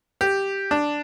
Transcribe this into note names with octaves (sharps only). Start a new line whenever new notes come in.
G4
D4